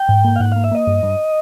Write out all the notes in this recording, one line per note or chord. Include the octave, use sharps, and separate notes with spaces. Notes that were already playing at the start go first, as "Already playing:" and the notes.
Already playing: G5
G#2
A#3
F5
G#2 F#5
A#3 F5
E5
A#3 D#5
G2
G2